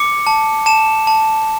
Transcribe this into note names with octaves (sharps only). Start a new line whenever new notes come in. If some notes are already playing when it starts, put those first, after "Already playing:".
Already playing: D6 C#7
A5
A5 E7
A5